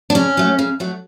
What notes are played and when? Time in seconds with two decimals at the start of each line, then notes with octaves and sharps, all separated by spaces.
0.10 D4
0.15 C#3 C#4
0.37 F#3 A3
0.59 C#3
0.80 F#3 A3